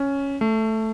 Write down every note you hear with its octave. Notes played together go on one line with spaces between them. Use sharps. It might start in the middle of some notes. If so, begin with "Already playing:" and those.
Already playing: C#4
A3